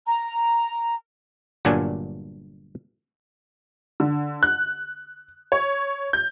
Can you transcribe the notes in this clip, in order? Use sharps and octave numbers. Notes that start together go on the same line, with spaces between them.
A#5
G1 G2 A#2 F#3 D4 G#5
D3
F#6
C#5
G6